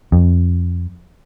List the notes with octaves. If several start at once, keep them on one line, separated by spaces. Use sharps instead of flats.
F2